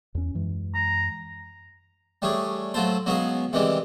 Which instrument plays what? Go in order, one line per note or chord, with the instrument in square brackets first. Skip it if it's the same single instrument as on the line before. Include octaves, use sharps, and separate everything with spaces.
[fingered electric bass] E2 C#4
F#2 E3 G#3
[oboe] A#5
[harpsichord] G3 A3 C#4 D4 G#4
F#3 A3 F4 A4 C5
F#3 G#3 B3 C#4 G#4 F5
C3 D#3 E3 G3 G#3